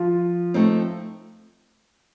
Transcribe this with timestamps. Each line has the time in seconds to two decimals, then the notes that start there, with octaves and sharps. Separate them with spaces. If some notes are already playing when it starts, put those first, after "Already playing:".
Already playing: F3 F4
0.54 A3 C4 D#4